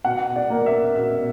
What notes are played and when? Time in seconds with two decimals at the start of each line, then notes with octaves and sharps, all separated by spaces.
0.05 B2 F#5
0.36 D5
0.50 A#3
0.66 E5
0.96 B2 E5